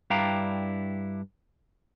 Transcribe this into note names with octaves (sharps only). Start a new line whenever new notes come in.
G2 D4 E4 F5 G5 A#5